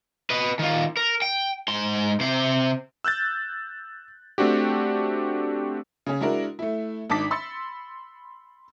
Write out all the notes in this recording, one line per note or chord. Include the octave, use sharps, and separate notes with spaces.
B4 D#5
D#3 F4
A#4
G5
G#2 C6
C3 C5
E6 F#6 G6 A6
A3 C4 D4 F#4 G4
C#3 C#4
G#3 D4 E4 F#4 A#4
A3 E4
G#1 D#3 D4 A5 D6 B6
B5 C6 E6 A6 C#7